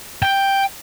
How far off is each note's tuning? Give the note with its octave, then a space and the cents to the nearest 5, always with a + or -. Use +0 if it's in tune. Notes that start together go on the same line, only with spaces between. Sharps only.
G5 +5